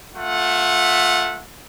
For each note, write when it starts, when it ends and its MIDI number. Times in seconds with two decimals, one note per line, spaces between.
0.16 1.43 57
0.16 1.43 65
0.16 1.43 76
0.16 1.43 78